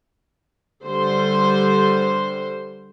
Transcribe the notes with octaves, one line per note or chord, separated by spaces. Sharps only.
D3 G3 C5 C6